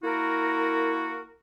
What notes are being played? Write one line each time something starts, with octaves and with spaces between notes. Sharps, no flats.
A#3 E4 F#4 A#4